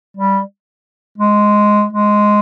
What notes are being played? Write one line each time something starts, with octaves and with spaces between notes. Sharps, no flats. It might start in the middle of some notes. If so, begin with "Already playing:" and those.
G3
G#3
G#3